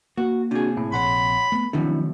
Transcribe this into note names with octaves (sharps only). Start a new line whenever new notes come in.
A#3 F#4
C3 D4 F#4 G#4
A2
A#1 C#5 F#5 B5 C6
A3 B3
F#2 C3 D#3 F3 A3 C#4 D4 E4